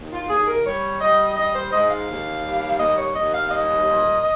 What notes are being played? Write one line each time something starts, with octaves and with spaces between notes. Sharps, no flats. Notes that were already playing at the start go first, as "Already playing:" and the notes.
Already playing: D#2
F4
D#2 G#4
A#4
G3 C#5
G3 D#5
G3 D#5
C5
G#2 D#5
F5
D#2
G3
D#2 D#5
C#5
D#2 D#5
F5
G3 D#5
A#2